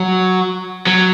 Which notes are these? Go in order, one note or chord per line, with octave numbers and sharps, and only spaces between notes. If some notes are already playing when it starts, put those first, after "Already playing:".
Already playing: F#3
F#3